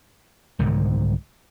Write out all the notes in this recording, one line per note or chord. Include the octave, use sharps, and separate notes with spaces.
C2 G#2 D3 D#3